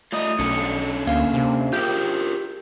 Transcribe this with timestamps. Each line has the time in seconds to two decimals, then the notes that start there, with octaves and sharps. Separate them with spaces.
0.12 A3 F4 D5 D#5 D#6
0.39 B1 C#4 D4 A4 C#7
1.07 D2 A#3 F5
1.34 C3
1.73 F4 G4 G#4 A#4 G6